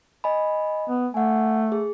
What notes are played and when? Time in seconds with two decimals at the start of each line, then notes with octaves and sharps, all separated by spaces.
0.24 D#5 G#5 B5
0.89 B3
1.14 A3 F#5 G#5
1.72 G#4